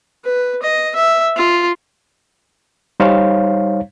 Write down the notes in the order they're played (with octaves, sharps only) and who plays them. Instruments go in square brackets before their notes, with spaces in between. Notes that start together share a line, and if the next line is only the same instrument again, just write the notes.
[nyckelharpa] B4
D#5
E5
F4
[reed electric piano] G3 D#4 C5 C#5 F5